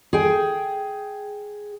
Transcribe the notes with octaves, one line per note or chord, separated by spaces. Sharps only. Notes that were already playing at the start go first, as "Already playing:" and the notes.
G#4 G5